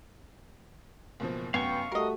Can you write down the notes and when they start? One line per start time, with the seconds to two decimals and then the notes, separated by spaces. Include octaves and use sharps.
1.20 F#1 B2 F3
1.54 F1 F#2 B3 C#4 F#4 F5 G5 C#6
1.92 G3 A3 F#4 A#4 D#5